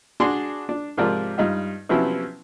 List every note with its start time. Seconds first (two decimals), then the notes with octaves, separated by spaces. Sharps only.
0.20 D4 F#4 G#4 D5 C6
0.69 D4
0.97 G#2 C3 F3 F4 A#4 D5
1.38 G2 D#4 F4
1.89 C3 F3 F#3 B3 C#4 E4